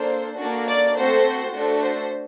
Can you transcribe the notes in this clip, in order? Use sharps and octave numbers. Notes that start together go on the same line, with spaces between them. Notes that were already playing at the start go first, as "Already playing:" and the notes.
Already playing: A#3 D4 A4 C5
A#3 D4 F#4 A4
D5
A3 C4 F#4 A4 C5
A3 D4 F#4 A4
C5